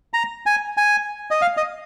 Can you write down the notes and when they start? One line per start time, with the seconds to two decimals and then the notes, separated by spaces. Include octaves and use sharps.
0.14 A#5
0.46 G#5
0.77 G#5
1.31 D#5
1.42 F5
1.57 D#5